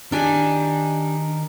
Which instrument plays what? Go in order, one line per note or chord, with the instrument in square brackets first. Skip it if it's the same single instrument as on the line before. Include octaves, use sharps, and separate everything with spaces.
[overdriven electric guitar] D#3 [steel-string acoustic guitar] D4 G4 G#5